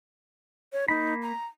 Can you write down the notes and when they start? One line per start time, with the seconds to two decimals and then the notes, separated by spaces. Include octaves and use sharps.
0.73 C#5
0.88 A#3 D#4 B5
1.22 A#5